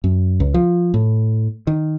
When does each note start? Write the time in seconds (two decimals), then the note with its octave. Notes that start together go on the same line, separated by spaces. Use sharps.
0.04 F#2
0.40 C#2
0.54 F3
0.94 A2
1.67 D#3